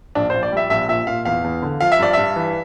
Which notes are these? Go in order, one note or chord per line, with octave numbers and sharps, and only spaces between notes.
A#1 D4
A#1 C5
D5
G3 E5
A#1 E5
A#2 E5
A#2 F5
E2 F5
E2
D3
F3 F5
E5
G2 D5
G2 E5
E3